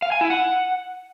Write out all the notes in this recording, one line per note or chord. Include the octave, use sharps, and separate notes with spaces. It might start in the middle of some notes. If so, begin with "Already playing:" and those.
F5
G#5
E4
F#5